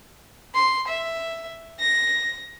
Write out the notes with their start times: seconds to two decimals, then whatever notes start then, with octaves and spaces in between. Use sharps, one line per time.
0.54 C6
0.88 E5
1.79 A#6